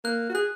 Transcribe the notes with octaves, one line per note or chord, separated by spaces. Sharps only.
A#3 F#6
F#4
G#4 F#6